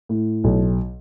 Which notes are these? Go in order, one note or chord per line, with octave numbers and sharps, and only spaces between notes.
A2
B1